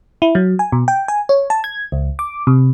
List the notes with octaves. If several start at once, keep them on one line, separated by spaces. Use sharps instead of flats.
E4
F#3
G#5
B2
G5
G#5
C#5
A5
G#6
C#2
D6
C3